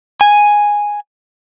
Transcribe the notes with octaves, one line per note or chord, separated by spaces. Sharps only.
G#5